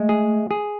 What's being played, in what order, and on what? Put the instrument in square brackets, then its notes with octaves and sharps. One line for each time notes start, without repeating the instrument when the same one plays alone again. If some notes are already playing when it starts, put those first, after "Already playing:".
Already playing: [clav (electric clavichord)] G#3 [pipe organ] A3
[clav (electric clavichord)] G#4
G#4